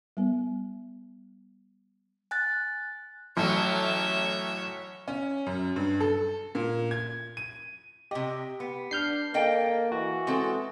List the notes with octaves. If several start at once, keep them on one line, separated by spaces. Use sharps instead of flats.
G3 B3
G#5 F#6 A6
A1 F#3 C#5 E5
C#4
F#2
G2
A4
A#2
G#6
D#7
C3 G4 D#5
B3
D4 F6 G6 C7
A#3 A4 D#5 G5
E3 F#4
G#3 C4 A4